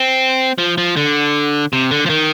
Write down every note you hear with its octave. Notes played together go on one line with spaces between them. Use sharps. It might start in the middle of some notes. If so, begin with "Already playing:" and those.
Already playing: C4
F3
F3
D3
C3
D3
F3
D#3